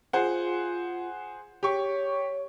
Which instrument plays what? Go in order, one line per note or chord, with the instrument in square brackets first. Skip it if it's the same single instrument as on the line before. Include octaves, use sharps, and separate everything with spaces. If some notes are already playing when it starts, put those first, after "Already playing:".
[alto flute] F4 [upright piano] G#4 C5 F#5
[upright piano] G4 C#6 [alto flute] C#5